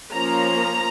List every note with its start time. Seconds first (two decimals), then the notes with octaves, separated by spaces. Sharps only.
0.12 F3 A#3 C#4 A#5